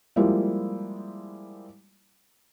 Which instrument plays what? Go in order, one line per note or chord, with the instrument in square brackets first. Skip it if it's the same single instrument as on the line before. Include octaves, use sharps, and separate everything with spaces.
[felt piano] F3 G3 G#3 A#3 E4